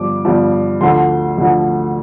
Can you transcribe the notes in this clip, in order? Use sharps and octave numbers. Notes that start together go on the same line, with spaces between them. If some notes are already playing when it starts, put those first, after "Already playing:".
Already playing: G1 G2 F3 D6
G1 G2 F3
D2 D3 F3 C6
D2 D3 F3